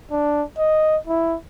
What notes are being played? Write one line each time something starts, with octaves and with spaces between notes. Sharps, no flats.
D4
D#5
E4